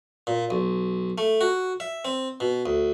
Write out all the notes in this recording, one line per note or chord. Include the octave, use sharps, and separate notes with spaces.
A#2
B1
A3
F#4
E5
C4
B2
D2